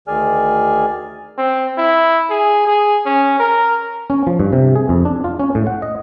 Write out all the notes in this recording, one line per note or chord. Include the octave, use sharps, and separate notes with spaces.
D2 D#3 G#4 D5 G#5 F6
C4
E4
G#4
G#4
C#4
A#4
C#4
F3
G2
C3
G#4
F2
D4
F4
C#4
A2
F#5
D#5